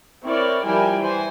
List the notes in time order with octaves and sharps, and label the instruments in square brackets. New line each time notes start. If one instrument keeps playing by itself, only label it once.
[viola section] C4 E4 A#4 C#5 D5
F3 G3 E4 A#4 G5 G#5
E3 C5 G#5